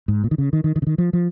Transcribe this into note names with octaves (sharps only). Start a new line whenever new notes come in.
G#2
A#2
D#3
C#3
D#3
D#3
D#3
C#3
D#3
F3
F3